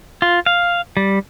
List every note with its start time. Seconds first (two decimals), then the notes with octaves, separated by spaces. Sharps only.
0.22 F4
0.46 F5
0.97 G3